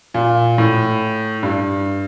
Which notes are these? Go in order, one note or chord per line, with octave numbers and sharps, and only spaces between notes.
A#2
A2
G2